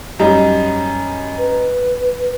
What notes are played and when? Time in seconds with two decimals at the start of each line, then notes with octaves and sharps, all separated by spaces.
0.19 F#2 G3 D#4
1.38 B4